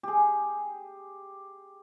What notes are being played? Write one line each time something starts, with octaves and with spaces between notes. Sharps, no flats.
G4 G#4